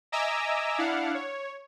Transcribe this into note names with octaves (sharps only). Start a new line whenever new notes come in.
D#5 E5 G#5 A#5 D6 E6
D4 E4 F5 F#5
C#5